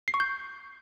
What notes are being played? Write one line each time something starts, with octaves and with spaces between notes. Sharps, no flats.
C7
C#6
G6